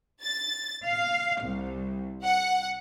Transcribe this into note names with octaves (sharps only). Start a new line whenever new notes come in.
A6
F5
C2
F#5